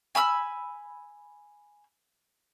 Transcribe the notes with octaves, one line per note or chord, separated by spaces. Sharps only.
G#5 B5 D#6 E6